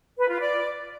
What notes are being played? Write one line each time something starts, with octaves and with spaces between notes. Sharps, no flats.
B4
F4
D5